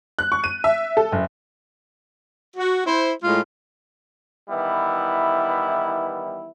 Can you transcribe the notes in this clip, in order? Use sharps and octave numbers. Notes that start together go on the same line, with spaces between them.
F#6
C#6
D#7
E5
A4
F#1
F#4
E4 C5
A2 G#3 F4
D#3 E3 G3 B3 E4